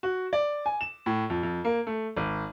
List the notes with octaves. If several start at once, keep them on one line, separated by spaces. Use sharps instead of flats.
F#4
D5
G#5
E7
A2
F2
F2
A#3
A3
G#1